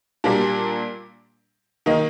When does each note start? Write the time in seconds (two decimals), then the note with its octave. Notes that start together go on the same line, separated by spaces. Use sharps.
0.24 A#2 G3 A#3 D4
1.86 D#3 A#3 D#4